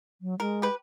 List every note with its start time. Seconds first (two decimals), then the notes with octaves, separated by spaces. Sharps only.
0.21 F#3
0.40 G#3 A#4
0.62 G4 B4